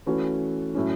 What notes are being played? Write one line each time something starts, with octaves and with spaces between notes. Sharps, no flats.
E3 A3 C#4 F#4 B4
A2 F#3 C#4